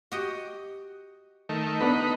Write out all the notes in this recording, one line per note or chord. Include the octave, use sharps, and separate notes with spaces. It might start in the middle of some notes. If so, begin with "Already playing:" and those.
F#4 G4 D#5
D#3 A3
B3 D4 D#4 B5